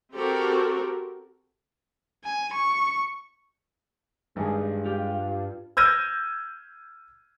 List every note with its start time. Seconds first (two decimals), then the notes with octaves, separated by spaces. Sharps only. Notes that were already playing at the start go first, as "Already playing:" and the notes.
0.15 C4 F#4 G4 A4 A#4
2.24 G#5
2.53 C#6
4.36 G#1 G2 G#3 G#4
4.86 F4 G4 G5
5.77 E6 F6 G6 G#6 A#6 D#7